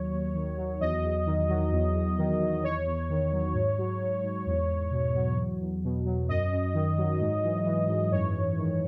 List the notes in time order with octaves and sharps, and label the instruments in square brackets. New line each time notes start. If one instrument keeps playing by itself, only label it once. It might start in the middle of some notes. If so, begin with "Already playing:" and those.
Already playing: [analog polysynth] D#2 F#3 C#5
D#2
D#3
F#3
E2 D#5
E2
D#3
F#3
E2
E2
D#3
F#3
E2 C#5
E2
D#3
F#3
G#2
F#3
F#3
G#2
E2
E2
B2
F#3
E2
E2
B2
F#3
F#2 D#5
F#2
D#3
F#3
G#2
E3
E3
G#2
F#2 C#5
F#2
D#3